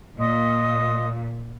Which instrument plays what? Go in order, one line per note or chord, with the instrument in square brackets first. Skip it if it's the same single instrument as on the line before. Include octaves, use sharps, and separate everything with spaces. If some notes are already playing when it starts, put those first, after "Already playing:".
[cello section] A#2 [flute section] D#5 C6 D#6